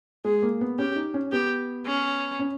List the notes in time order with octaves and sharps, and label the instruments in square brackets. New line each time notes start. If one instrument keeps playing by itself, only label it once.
[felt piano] G#3 [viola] G#4
[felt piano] A#3
B3
[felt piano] C#4 [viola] G4
[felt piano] D#4
C#4
[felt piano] B3 [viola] G4
[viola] C#4
[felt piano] C#4